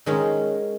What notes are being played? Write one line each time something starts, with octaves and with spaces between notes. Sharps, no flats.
D#3 G#3 C#4